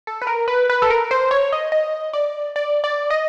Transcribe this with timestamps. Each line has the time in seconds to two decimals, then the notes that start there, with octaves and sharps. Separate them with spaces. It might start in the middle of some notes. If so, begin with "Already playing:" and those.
0.07 A4
0.22 B4
0.27 A#4
0.48 B4
0.70 B4
0.82 A4
0.90 A#4
1.11 C5
1.31 C#5
1.52 D#5
1.72 D#5
2.13 D5
2.56 D5
2.84 D5
3.11 D#5